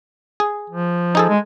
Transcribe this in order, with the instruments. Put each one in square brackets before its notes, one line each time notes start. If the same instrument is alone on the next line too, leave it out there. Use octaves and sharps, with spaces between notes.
[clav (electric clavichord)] G#4
[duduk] F3
[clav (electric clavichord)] D#4 G#4 A4
[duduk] G#3